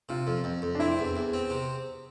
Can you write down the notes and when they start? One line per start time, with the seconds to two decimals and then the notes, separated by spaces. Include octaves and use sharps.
0.09 C3 F4
0.27 F2
0.44 F2
0.62 F2
0.75 D4
0.80 C4 E4
0.98 E2
1.16 E2
1.33 C4
1.50 C3